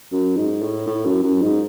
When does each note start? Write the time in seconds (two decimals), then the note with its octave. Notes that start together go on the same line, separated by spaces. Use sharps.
0.12 F#2
0.37 G#2
0.62 A2
0.87 A2
1.05 F#2
1.23 F#2
1.42 G#2